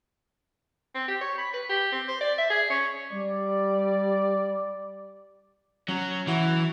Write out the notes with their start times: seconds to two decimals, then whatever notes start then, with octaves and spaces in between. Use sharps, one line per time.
0.95 C4
1.08 G4
1.21 C#5
1.38 B5
1.53 B4
1.69 G4
1.92 C4
2.08 C5
2.21 D5
2.38 E5
2.50 G#4
2.70 C#4
3.10 G3 D5
5.89 F#3 C#4
6.27 E3 F#3 E4 F#4